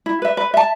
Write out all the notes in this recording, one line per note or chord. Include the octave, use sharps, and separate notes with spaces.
E4
B4 E5
B4
E5 A5